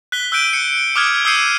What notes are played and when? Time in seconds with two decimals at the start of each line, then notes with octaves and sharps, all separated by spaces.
0.12 F#6 B6 G7
0.32 E6 F#6 G6 D7 D#7
0.53 C#7
0.96 D6 D#6 F6 F#6 G#6 D7
1.25 D#6 E6 G6 C7 C#7 D#7